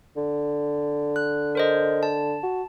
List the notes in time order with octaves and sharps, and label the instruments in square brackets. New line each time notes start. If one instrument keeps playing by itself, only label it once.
[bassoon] D3
[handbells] F#6
A#4 C5 D#5
A5
[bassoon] F#4